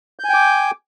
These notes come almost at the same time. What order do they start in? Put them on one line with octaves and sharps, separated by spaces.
G6 G#5 G5 D6